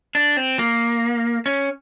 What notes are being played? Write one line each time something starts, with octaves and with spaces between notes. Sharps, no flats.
D4
C4
A#3
C#4